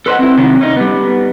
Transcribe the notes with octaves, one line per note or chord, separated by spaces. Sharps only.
A4 B4 C5 D5 D#5 F#5
C4 E4
C3 D#3 F#3 C#4
C#4 D#4
G3 B3